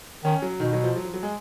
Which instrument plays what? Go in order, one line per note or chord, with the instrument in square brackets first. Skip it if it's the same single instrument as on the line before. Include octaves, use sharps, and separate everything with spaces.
[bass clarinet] D#3 [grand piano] C#4
[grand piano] F#3
[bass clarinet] B2 [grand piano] D#3
[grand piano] F#3
F3
F#3
F3
F#3
G#3